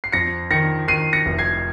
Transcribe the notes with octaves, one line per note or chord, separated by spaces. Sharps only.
C7
F2 A#6 C#7
D#3 A#6 C#7
D#3 C7 D#7
A#6 C#7
F1
G#6 C7